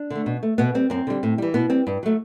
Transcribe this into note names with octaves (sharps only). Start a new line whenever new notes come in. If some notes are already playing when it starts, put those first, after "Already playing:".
Already playing: D4
D3 A3
B2
A3
B2 B3
G3 C4
F#2 C4
D3 G3
A2
E3 G3
B2 B3
G3 C4
G2
F#3 A3